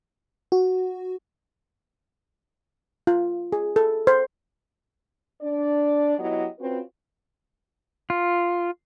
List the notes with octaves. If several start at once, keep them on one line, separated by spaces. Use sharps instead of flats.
F#4
F4
G#4
A4
C5
D4 D5
F#3 B3 E4 G4 D#5
C4 C#4 F4 F#4 B4
F4